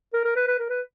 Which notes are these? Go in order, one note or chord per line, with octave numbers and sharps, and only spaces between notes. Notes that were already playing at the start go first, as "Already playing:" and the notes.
A#4
A#4
B4
B4
A#4
B4